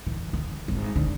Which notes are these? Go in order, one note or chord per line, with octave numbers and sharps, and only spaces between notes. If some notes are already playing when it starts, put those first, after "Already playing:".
E3
D#3
G#1
D#3 D4